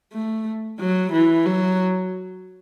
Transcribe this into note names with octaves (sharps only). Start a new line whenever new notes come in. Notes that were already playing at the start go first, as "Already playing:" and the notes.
A3
F#3
E3
F#3